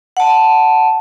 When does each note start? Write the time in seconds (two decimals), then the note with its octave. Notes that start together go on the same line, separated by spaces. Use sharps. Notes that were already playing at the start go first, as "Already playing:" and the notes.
0.17 F#5 A5